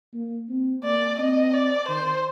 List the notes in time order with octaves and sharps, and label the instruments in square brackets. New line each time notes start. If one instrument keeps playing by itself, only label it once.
[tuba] A#3
C4
[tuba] A#3 [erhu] D5
[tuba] C4 [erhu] D#5
[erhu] D5
[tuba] D#3 [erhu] C5